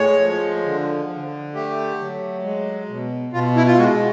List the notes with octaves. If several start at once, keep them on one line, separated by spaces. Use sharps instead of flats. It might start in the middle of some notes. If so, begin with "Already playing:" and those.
Already playing: A2 G#3 C#5
F3
D3
D3
A3 G4
F#3
G#3
B2
B2 F4
E4
F4
G#3 F#4